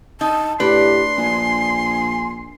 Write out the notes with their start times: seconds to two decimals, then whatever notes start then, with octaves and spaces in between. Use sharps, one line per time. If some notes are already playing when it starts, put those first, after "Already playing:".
0.21 D#4 A5
0.60 A2 D4 G4 B4 C6
1.18 A#1 G#5